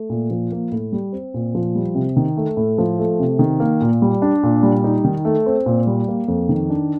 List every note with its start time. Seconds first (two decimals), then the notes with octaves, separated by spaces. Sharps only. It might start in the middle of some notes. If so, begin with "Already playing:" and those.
Already playing: A3
0.10 A#2
0.31 F3
0.52 A#3
0.72 A2
0.92 G3
1.12 C4
1.34 A#2
1.55 F3
1.75 G3
1.95 C3
2.16 D#3
2.37 A3
2.57 A2
2.78 F3
2.99 A3
3.20 C3
3.39 D#3
3.60 A#3
3.81 A#2
4.02 G3
4.22 D4
4.43 A#2
4.63 G3
4.84 D#4
5.05 D#3
5.25 A3
5.46 C4
5.66 A#2
5.87 G3
6.08 A#3
6.28 F2
6.49 D#3
6.70 D4